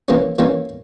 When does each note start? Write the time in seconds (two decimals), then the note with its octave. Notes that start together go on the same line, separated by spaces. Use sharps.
0.08 E3 G3 A#3 C#4
0.39 E3 G3 A#3 C#4